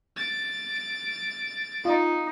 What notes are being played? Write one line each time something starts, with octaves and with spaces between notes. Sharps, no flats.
A6 D7
D#4 F4